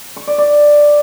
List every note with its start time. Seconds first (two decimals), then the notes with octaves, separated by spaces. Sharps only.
0.17 C#6
0.27 D5
0.38 D5